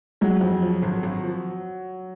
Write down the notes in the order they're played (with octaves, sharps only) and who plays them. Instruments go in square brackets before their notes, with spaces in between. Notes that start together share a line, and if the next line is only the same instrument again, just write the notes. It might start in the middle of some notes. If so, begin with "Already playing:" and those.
[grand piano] F#3 [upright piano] G#3
[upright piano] F2
F3
G#1
G#1
F3